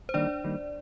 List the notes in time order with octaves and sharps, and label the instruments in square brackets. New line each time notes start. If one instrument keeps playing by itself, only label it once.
[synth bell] C5
[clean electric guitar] D#3 G3 A#3 D#4 [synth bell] D4 D5
[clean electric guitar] D#3 G3 A#3 D#4